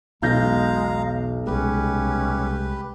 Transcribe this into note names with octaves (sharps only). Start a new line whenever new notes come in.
B1 E2 B2 G#3 F5 A#5 G6 A#6
C2 G#3 C#4 G4 B4